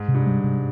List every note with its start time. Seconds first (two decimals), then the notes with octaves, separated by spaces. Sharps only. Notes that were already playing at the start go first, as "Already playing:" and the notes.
Already playing: G#2
0.08 C3
0.14 G2
0.27 G3
0.44 C3